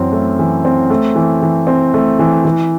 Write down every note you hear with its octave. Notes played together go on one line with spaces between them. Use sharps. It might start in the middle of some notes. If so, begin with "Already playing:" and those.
Already playing: F#2 E3 C4
A3
E3
C4
A3
E3
E3
C4
A3
E3
E3